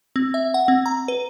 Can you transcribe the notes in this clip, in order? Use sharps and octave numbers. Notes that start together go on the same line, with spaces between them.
C4
E5
F#5
C4
A#5
B4